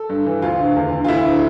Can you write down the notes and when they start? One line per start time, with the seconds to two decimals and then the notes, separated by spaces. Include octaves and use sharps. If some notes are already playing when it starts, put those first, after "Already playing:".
Already playing: A4
0.10 G2
0.26 E3
0.42 D2 F4
0.59 D3
0.76 E2
0.92 D3
1.04 F4
1.08 D2 E4
1.25 D3